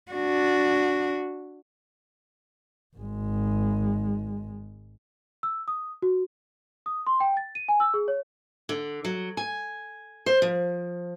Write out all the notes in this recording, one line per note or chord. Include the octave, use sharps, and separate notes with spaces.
D4 F#4
G#1 G#3
E6
D#6
F#4
D#6
C6
G5
A6
D#7
G#5
E6
G#4
C#5
D3
F#3
G#5
C5
F3